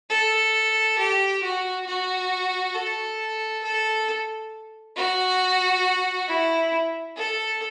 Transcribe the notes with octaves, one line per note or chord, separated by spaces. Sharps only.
A4
G4
F#4
F#4
A4
A4
F#4
E4
A4